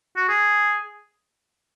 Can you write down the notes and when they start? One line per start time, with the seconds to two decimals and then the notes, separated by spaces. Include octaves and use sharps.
0.16 F#4
0.29 G#4